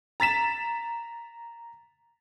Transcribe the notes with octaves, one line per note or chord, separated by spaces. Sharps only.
A#5 A6 B6 E7